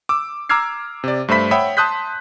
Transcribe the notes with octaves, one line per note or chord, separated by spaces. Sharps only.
D6 E6
A#5 D6 E6 F6 G#6 C7
C3 D5
G2 A3 C5 E5 B5 B6
C#5 E5 F#5 G5 B5 D#6
A5 C6 D#6 F#6 G6 B6